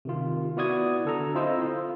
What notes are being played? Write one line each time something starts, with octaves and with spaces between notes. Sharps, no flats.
C3 D#3 F4
B3 E4 F#4 D5 D#6 G#6
D3 A4 A#5
C4 E4 F4 C5 D#5 E6
F4